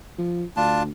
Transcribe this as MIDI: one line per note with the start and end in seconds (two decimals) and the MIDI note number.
0.18 0.44 53
0.57 0.90 38
0.57 0.83 62
0.57 0.83 65
0.57 0.83 81